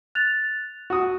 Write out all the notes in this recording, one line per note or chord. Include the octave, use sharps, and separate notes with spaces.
F#6 A6 F7
F#4 F#5 D#6